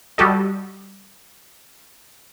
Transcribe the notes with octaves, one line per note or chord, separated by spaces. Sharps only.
G3 F#4 G4 A4 D#5